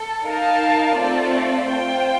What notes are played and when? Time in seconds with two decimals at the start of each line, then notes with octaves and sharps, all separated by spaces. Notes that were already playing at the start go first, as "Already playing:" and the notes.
Already playing: A4
0.24 D#4 A#4 F5 A5
0.96 A3 C4 F4 A4 D5
1.68 F4 C5 G5